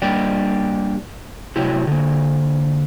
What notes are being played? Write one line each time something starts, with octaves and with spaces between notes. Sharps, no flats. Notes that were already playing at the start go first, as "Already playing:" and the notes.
G3 A#3 D4 G4 D5
A2 C3 F#3 E4 G4
D3 A#3